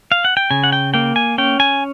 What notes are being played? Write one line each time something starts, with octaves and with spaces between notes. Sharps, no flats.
F5
F#5
G5
C#3 G#5
F#5
G5
A#3 G5
G#5
C#4 G5
G#5